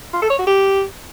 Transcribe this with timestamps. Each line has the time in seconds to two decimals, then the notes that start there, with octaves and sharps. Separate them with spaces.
0.13 F4
0.22 A4
0.30 C#5
0.39 F#4
0.47 G4